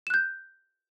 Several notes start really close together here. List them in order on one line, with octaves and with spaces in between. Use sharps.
E7 F#6 G6